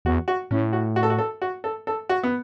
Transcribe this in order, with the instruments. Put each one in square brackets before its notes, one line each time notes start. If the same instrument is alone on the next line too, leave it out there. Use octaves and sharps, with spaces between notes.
[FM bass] E2 [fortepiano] F#4
[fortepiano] F#4
[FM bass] A2 [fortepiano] C#4
[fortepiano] F#4
F#4
A4
F#4
A4
F#4
A4
A4
F#4
B3